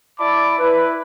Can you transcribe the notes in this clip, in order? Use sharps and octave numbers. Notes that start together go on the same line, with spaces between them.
E4 D5 A5 B5 D6
E4 B4